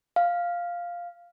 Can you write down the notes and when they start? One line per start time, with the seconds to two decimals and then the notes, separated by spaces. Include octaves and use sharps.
0.16 F5